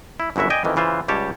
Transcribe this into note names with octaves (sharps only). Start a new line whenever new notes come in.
E4
G1 F#2 E4 F#4 E5
D5 D#5 G5 G#5
F2 D#3 E3
C#3 E3 F4 C5
C#2 G3 G4 C#5 A5